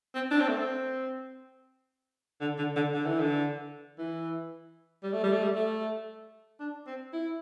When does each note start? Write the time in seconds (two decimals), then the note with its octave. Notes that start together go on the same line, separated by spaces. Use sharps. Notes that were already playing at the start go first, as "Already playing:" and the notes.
0.15 C4
0.31 D4
0.40 C4
0.49 A3
0.56 C4
2.41 D3
2.58 D3
2.76 D3
2.94 D3
3.06 E3
3.20 D3
3.98 E3
5.03 G3
5.13 A3
5.24 G3
5.33 A3
5.43 G3
5.56 A3
6.60 D4
6.87 C4
7.13 E4